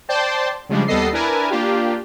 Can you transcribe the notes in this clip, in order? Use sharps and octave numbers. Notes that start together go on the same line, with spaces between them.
C5 D5 G5 A5 C6
C#3 F3 G3 G#3 D4
D#2 G3 B3 A4 D#5 C7
D4 E4 A#4 B4 G#5 A5
A#3 D4 F4 G4